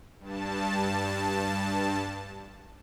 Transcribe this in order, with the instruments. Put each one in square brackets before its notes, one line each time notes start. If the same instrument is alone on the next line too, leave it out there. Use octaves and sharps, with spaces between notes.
[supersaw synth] G2 A5